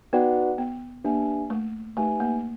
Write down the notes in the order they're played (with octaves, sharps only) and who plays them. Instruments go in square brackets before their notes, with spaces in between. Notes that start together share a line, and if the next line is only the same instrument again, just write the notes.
[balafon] B3 [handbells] D#4 F#4 B4 D5 F#5
[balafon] B3
[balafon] A#3 [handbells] D4 G4 B4 E5 G#5
[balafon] A3
[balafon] A3 [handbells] D#4 G4 B4 E5 G#5
[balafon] A#3